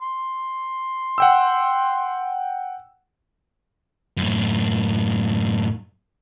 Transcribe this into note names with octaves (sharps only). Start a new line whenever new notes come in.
C6
F#5 G5 E6
F#2 A2